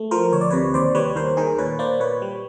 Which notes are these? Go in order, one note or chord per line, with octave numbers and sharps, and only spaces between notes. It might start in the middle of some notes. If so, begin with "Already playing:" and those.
Already playing: A3
F3 A#4 C5
D2 C#5
D5
C3 B4 C#5
D#2 C5 D5
G3 B4 C#5
D#2 A#4 C5
D#3 G#4 A#4
A#2 B4 C#5
A#3 C5 D5
A#2 B4 C#5
G3